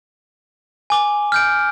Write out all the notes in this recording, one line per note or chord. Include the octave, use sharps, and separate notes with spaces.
G#5 D6 G7
F6 G6 D7